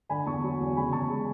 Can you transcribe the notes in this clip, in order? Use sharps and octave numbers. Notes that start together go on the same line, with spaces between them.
D3 G#5 B5
E2 A5 C#6
F#3
E2
C#3 G#5 B5
E2 A5 C#6
G#3